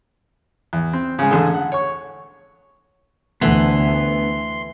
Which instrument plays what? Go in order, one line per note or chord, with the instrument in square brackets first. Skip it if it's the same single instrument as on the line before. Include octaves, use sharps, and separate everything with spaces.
[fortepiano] E2
C4
C#3 G#3
A1 E2 D3 G#4 A4
F#5
C#5 C#6
[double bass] D2 [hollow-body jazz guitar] D3 A3 B3 [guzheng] E3 [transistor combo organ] C6